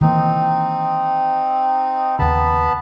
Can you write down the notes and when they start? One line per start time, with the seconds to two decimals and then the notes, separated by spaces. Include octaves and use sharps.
0.01 D#3 E3 A#3 C4 D#4
2.19 D#2 C#3 B3 A5 B5